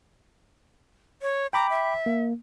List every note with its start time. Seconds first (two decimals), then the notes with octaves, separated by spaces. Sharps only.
1.22 C#5
1.53 G5 A#5 B5 D6
1.70 E5
2.06 A#3